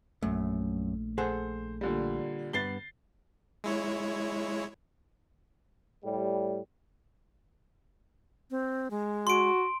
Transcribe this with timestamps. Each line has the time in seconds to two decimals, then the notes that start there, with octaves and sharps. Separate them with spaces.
0.23 A#1 F#2 A3
1.18 G#4 A4 C5 F#5
1.81 A#2 D3 G3
2.53 G2 B3 A6 C7 G7
3.64 G#3 E4 C#5
6.03 A2 G3
8.51 C4
8.91 G#3
9.27 F#4 C6 D7